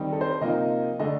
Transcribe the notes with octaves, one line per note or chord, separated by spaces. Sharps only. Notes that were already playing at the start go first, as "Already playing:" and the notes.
Already playing: D#3 G3 C4 D#4
A4
C5
C3 F3 A#3 D#4 D#5
D3 A3 D4 D#5